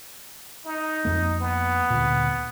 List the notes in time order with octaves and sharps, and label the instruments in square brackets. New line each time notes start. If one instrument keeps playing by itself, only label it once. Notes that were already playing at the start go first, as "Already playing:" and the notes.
[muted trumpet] D#4
[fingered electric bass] F2 A#3
[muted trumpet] B3
[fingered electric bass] D2 A#2